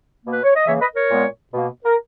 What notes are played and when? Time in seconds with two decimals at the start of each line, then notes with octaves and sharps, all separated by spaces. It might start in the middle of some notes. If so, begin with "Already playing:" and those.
0.23 B2 A#3
0.31 B4
0.44 C#5
0.55 D#5
0.66 C#3 E3 A#3 C#5 E5
0.80 B4 D#5
0.95 A#4 C#5
1.09 A#2 G#3 B3
1.52 B2 A#3
1.85 A#4